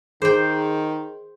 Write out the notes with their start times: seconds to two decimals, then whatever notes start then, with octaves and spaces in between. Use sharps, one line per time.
0.22 D#3 G#4 C5 G5